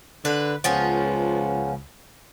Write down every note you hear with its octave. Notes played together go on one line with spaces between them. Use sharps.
D3 B4
C#2 F3 B3 C#4